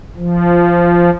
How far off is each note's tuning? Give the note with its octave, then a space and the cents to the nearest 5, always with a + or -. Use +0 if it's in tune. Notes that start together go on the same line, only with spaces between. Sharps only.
F3 -10